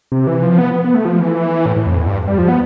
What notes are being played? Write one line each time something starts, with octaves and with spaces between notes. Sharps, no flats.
C3
E3
F3
B3
B3
B3
A3
F3
E3
A2
A2
F2
E2
G2
G3
F3
B3